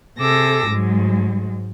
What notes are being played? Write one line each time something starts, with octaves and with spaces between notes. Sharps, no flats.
C3 G#4 A4 D6 E6 A#6
G#2 F#3 G#3